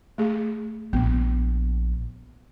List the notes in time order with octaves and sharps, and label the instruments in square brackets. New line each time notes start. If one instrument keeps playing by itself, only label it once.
[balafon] A3 G#4
[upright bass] A#1 [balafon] B3